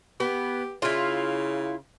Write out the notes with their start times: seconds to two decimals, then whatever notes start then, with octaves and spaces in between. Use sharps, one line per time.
0.20 B3 G4
0.82 C#3 E4 F4